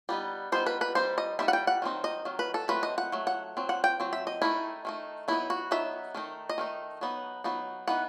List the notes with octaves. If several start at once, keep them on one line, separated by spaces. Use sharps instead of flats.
G3 B3 D#4
G3 B3 D#4 C5
B4
B4
G3 C4 D#4 C5
D#5
G3 C4 D#4 E5
F#5
G5
F#5
D#3 F#3 C4 D#4
D#5
D#3 F#3
B4
A4
F#3 A3 C4 B4
D#5
F#5
F#3 A3
F#5
F#3 C4
F#5
G5
F#3 C4
E5
D#5
D#3 A3 D#4 E4
D#3 A3 D#4
F#3 B3 D#4 E4
F#4
F#3 B3 D#4 E5
D#3 A3 D#4
D#5
D#3 A3 D#4
F#3 B3 D#4
F#3 B3 D#4
E3 B3 D#4 F#5